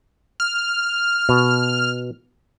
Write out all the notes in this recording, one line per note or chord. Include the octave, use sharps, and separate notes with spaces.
F6
B2